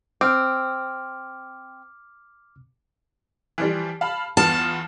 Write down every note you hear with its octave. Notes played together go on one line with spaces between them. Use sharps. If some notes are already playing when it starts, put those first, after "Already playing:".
C4 D6 F6
E3 F3 G3
F5 A5 B5
E2 B3 F4 A5